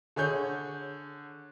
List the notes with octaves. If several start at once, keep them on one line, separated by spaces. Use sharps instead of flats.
D3 G#4 C#5 G6